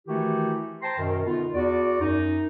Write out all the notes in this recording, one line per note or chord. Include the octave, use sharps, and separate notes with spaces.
D#3 E3 A3 E4 F#4 G4
C5 G5 A5 A#5 C6
F#2 B2 D#3
D3 B3 D#4 F4
E2 F#4 D5
F#2 D#4